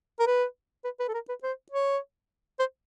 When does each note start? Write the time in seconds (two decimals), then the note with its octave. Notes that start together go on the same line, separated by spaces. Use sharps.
0.20 A#4
0.27 B4
0.85 B4
1.00 B4
1.08 A4
1.14 A#4
1.29 B4
1.43 C5
1.72 C#5
2.60 C5